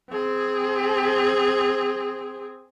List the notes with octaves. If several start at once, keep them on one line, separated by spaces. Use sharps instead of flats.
C4 G#4